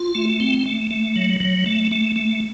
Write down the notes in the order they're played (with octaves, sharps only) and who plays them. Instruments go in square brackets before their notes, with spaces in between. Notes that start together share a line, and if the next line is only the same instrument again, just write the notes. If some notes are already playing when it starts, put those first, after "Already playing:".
Already playing: [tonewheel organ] F4
A3
C4
A3
A3
F#3
F#3
A3
A3
A3